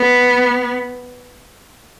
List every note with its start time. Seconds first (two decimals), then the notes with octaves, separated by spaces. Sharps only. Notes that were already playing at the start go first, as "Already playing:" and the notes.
Already playing: B3